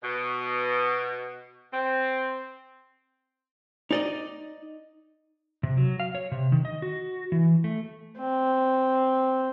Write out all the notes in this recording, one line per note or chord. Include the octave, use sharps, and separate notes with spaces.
B2
C4
D#4 D5 D#5
C3
F#3
F5
C#5
C3
D#3
D#5
F#4
E3
A3
C4